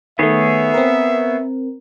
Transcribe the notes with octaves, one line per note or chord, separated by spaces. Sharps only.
D#3 A3 B3 G#4 C#5 E5
C4 A#4